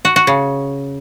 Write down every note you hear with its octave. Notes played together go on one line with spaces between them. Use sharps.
F#4
F#4
C#3